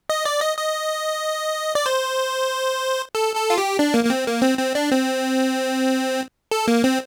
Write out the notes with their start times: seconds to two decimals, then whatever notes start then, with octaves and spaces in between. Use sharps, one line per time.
0.09 D#5
0.25 D5
0.41 D#5
0.57 D#5
1.75 D5
1.86 C5
3.15 A4
3.35 A4
3.50 F4
3.58 G4
3.79 D4
3.94 A#3
4.05 A#3
4.10 C4
4.27 A#3
4.42 C4
4.58 C4
4.75 D4
4.91 C4
6.51 A4
6.68 A#3
6.84 C4